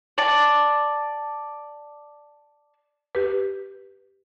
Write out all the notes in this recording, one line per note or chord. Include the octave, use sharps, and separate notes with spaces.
D5 A5
G4 B4